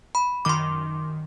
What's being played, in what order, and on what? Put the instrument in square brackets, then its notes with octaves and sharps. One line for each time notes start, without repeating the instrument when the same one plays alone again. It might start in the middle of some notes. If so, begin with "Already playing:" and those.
[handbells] B5
[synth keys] F#2 D#3 [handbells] C6 D6